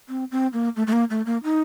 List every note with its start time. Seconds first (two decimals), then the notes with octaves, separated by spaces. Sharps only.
0.09 C4
0.31 C4
0.53 A#3
0.76 A3
0.87 A3
0.93 A#3
1.10 A3
1.26 A#3
1.44 D#4